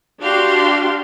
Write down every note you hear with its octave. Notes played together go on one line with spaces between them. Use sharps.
D4 F#4 G4 F5 C6